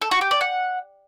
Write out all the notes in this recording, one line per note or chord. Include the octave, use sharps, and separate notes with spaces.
A4
F#4
G4
D5
F#5